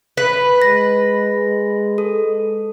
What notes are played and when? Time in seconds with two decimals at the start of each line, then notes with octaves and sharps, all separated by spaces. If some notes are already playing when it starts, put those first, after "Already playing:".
0.17 B4
0.62 G#3 A#6
1.98 A4